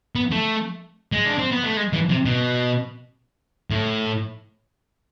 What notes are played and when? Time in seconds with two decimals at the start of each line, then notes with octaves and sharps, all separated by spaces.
0.15 B3
0.31 A3
1.12 G#3
1.25 D4
1.39 C4
1.52 B3
1.64 A3
1.77 G#3
1.93 E3
2.09 C3
2.26 B2
3.71 A2